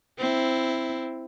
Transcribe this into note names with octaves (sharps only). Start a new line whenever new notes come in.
C4 E4